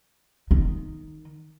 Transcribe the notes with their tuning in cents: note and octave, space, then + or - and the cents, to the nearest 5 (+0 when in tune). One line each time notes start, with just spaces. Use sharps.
D#3 +0 D#4 +0